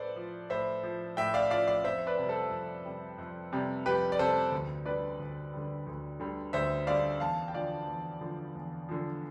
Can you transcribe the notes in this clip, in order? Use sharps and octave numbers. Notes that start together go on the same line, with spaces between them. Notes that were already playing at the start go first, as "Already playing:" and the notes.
Already playing: A2 F3 A4 B4 C5 D5
F3
A2 C5 E5
F3
A2 E5 G5
D5 F5
F3 D5 F5
D5 F5
F2 C5 E5
B4 D5
C3
G3
A4 C5
F2
C3 G3
F2
C3 G3
F2 G4 B4
D5
C3 G3 A4 C5
D2
D3 G3 B4 D5
D2
D3 G3
D2
D3 G3
D2 C5 E5
D3 G3 D5 F5
E2 F5 A5
G5
D3 F3 D5 F5
E2
D3 F3
E2
D3 F3